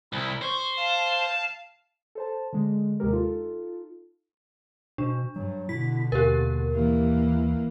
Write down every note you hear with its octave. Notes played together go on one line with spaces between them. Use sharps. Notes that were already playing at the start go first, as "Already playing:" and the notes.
C2 E4
C5 C#6
F5 A5
A4 C5 A5
D3 G#3
D#2 C3 G#3 G4 A#4
D#4 F4 A4
B2 D4
G2 F#3
B2 D3 E4 B6
D#2 G4 A#4
E3 A#3